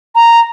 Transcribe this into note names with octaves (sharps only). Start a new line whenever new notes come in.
A#5